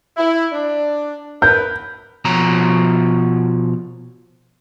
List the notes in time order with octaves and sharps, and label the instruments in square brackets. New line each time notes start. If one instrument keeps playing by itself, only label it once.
[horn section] E4
D4
[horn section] A#4 B4 [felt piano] G6
[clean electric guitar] B2 F3 C#5 A#5